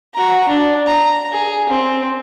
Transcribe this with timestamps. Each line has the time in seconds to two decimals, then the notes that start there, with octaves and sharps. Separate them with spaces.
0.14 F#4 A#5
0.49 D4
0.87 A#5
1.32 G#4
1.69 C4